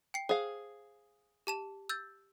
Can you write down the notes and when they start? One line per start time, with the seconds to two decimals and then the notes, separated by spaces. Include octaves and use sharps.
0.14 G5 C7
0.29 G#4 C5 F5
1.47 G4 A5 E7
1.89 E6 G6 A6